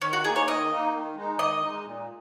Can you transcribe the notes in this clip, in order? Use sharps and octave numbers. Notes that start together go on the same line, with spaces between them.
D#3 C#4
F#4
A#3 D#4 G#4
C#5
D#3 D#5
A#3 D#4
D#3
G#3 D#4
D#3 D#5
G#3 D#4
A#2